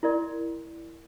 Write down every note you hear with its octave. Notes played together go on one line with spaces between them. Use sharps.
E4 A#4 D5 C6